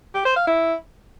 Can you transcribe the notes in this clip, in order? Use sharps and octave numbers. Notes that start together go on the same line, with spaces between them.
G4
C5
F5
E4